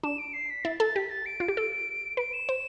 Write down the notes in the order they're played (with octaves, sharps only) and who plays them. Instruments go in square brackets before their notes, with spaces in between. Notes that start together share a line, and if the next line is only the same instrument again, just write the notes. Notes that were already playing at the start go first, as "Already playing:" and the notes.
[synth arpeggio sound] D4 [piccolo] E7
[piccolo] D7
C7
B6
[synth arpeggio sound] E4 [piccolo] A6
[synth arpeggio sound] A4 [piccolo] A6
[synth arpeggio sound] G4 [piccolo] B6
[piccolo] A6
D7
[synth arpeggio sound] F4
G4
A4
[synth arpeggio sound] B4 [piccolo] D7
[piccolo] E7
[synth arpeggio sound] C5